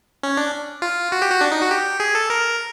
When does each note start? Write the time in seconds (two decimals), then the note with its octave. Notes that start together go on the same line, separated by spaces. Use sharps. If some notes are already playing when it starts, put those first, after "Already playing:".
0.23 C#4
0.37 D4
0.82 F4
1.12 F#4
1.22 G4
1.31 F#4
1.41 D4
1.51 D#4
1.61 F#4
1.71 G4
2.00 G#4
2.15 A4
2.30 A#4